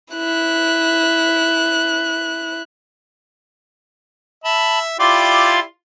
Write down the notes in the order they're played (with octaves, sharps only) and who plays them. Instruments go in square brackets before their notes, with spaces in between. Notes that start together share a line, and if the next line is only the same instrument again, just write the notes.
[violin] E4 F#6
[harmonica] E5 [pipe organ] A5 B5
[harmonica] E4 G4 D5 [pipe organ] F4 F5 C6